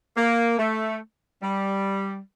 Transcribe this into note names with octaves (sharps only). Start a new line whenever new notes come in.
A#3
A3
G3